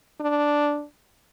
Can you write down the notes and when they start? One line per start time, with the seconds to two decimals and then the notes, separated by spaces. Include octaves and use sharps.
0.21 D4